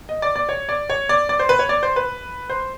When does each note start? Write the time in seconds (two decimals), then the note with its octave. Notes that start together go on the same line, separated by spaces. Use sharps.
0.09 D#5
0.22 D5
0.36 D5
0.49 C#5
0.69 D5
0.90 C#5
1.09 D5
1.29 D5
1.39 C5
1.49 B4
1.59 C#5
1.69 D5
1.83 C5
1.96 B4
2.50 C5